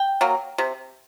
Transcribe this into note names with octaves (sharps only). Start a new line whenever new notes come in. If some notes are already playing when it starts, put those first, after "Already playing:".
Already playing: G5
F#3 A#3
C3